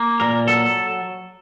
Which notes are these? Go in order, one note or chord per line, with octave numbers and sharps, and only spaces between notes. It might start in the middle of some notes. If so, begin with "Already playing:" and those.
Already playing: A#3
A#2 A#4
F#3 A4